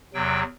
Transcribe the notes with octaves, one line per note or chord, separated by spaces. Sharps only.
E2 C3 F#3 G5